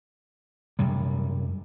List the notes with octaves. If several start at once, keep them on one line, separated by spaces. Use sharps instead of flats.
F#2 C3 G3